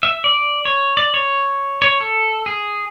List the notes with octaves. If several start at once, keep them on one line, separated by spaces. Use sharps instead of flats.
E5
D5
C#5
D5
C#5
C#5
A4
G#4